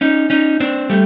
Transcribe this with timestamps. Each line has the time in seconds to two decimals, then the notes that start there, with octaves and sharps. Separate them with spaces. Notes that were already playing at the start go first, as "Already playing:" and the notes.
0.01 C#4 D#4
0.30 C#4 D#4
0.60 C4 D4
0.90 G3 A3